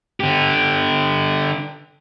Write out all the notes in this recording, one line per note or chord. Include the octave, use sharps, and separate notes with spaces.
D3 G4